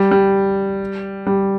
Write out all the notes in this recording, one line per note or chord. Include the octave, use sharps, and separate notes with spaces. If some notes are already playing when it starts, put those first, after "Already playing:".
Already playing: G3
G3
G3